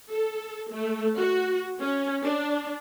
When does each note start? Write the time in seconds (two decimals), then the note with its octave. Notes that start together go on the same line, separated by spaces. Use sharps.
0.12 A4
0.73 A3
1.18 F#4
1.81 C#4
2.24 D4